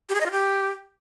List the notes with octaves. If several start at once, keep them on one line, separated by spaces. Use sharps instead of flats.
G4
G#4
D#5
F4
G4